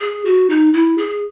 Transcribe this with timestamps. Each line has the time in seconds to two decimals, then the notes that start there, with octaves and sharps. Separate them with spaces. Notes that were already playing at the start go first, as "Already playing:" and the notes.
0.01 G#4
0.25 F#4
0.50 D#4
0.73 E4
0.98 G#4